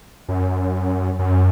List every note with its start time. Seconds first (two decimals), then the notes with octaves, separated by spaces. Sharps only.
0.28 F#2
1.19 F#2